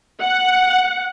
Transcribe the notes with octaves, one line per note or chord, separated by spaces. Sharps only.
F#5